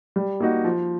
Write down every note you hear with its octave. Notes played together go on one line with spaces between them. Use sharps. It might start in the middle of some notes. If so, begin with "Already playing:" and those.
G3
A#3 D#4 F#4
F3